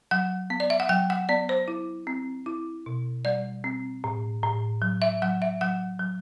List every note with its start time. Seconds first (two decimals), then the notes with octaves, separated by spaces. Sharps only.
0.11 F#3 F#5
0.50 B3
0.60 D5
0.70 E5
0.80 F#5
0.89 F#3 G5
1.10 F#5
1.29 B3 D5
1.49 C5
1.68 E4
2.07 C4
2.46 E4
2.86 B2
3.25 G3 D5
3.64 C4
4.04 A2
4.43 A2
4.82 F#3
5.02 E5
5.22 F#3 F#5
5.42 E5
5.61 F#3 F#5
5.99 F#3